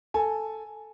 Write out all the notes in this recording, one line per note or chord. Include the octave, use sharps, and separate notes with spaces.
A4 G#5